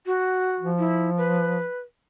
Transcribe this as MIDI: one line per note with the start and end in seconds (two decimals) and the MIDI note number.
0.06 0.68 66
0.60 1.64 53
0.79 1.10 64
1.17 1.78 71